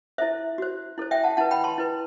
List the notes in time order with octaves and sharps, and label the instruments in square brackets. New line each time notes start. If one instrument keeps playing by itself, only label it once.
[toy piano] E4 A4 C5 E5
F#4 C5
E4 A4 C5
E5 G5
F#5 A5
E4 F#5 A5
B4
G5 B5
A5 C6
E4 B4